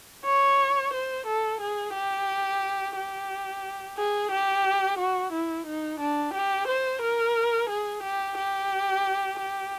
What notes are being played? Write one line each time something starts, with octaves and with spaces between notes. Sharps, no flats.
C#5
C5
A4
G#4
G4
G4
G#4
G4
F#4
E4
D#4
D4
G4
C5
A#4
G#4
G4
G4
G4